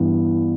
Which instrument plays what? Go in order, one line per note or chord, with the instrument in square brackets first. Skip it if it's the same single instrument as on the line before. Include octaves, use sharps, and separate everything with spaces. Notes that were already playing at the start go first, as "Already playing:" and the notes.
Already playing: [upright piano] G2 E3 B3